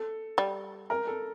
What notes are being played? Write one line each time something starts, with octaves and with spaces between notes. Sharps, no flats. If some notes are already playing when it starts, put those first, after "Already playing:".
Already playing: A4
G3
A#4
A4